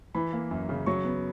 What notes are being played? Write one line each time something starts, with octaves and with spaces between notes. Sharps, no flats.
E3 B5
A#3
F#2
C#3
F#3 C#6
B3